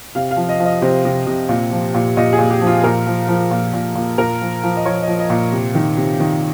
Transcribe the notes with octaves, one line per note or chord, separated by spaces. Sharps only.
C3 F5
F5
F3
D#5
F3
D#5
C3 C5
C3
C3
A#2
F3
A#2
A#2 D#5
G#4
A#2
G4
F3
F4
A#2 A#4
F3
F3
A#2
A#2
A#2
A#2 A#4
F3
F3
D#5
F3 C#5
D#5
F3
D#5
A#2
C3
D#3
C3
D#3